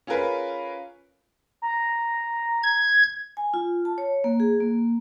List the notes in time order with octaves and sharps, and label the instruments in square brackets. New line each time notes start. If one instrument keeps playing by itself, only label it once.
[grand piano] C#4 F4 G#4 A#4 B4
[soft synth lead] A#5
[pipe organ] G#6
[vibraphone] G#5
F4
A5
C#5
A#3
G#4
A#3